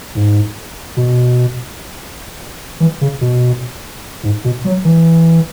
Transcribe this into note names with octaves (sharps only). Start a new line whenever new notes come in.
G#2
B2
E3
C#3
B2
G#2
B2
F#3
E3